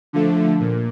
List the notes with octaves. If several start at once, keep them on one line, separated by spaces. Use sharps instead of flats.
D3 F3 A3
A#2